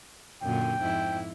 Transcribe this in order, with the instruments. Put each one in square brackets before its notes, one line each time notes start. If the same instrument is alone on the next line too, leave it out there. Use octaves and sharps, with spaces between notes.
[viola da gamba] F#2 A#2 D3 [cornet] G5
[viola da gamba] F2 G#2 E4